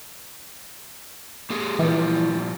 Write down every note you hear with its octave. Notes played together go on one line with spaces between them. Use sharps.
A#3 G4 G#4
A#2 E3 F3 G3